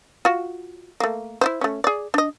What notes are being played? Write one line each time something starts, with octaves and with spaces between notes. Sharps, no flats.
F4 F#4
A3 A#3
E4 F4 C5
A3 C#4
G#4 D5
D4 D#5